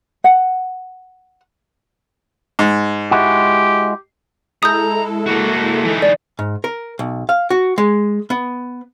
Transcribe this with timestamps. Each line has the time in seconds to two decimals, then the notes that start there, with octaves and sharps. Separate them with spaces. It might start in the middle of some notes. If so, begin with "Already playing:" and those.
0.24 F#5
2.59 G#2
3.11 G#3 E4 F#4 G4
4.63 G#3 E4 A4 A#5 D#6 G6
5.26 A#3 F#4
5.85 E3 D#4
6.02 D5
6.39 G#2
6.64 A#4
6.99 B1
7.29 F5
7.50 F#4
7.78 G#3
8.30 B3